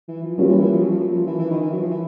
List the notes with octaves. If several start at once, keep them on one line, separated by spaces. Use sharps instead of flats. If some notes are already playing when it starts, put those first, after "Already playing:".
E3
F3
F#3 G3 A#3 C#4 F4 A#4
E3
E3
F3
F#3
F3
F#3
F3
E3
E3
D#3
E3
F#3
F3
E3